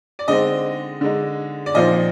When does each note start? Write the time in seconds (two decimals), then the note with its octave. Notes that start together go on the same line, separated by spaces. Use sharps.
0.19 D5
0.28 D3 G#3 C4 D#4 D#5
1.01 D3 G#3 D#4
1.66 D5
1.75 A#2 F3 C4 D#4 D#5